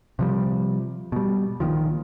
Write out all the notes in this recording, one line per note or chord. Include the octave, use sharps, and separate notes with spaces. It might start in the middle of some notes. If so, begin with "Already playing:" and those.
C3 F3 G3
B2 G3
A#1 A#2 D#3 F3